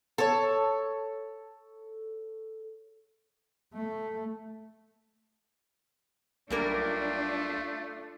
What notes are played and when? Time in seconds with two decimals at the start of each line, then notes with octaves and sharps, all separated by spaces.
0.18 A4 C#5
3.75 A3
6.50 B1 G3 A3 A#3 D4 F4 A#4